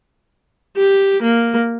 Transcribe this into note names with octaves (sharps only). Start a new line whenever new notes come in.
G4
A#3